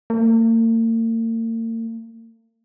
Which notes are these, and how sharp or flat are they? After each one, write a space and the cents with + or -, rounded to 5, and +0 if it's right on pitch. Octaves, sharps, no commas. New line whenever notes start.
A#3 -45